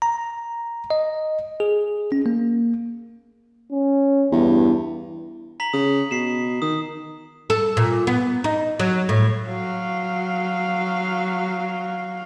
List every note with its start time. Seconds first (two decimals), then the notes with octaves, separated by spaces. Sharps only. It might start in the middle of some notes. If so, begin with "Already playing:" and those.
0.02 A#5
0.90 D#5
1.60 G#4
2.12 C#4
2.26 A#3
3.72 C#4
4.32 E2 G2
5.60 A#5 B6 F#7
5.73 C#3 D#6
6.11 B2 B6 C7 E7
6.62 D#3 D#6
7.50 A4
7.77 A#2
8.07 B3
8.44 D#4
8.79 F#3
9.09 A2
9.48 F#3 F5